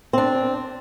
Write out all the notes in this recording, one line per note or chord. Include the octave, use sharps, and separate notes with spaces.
C4 D4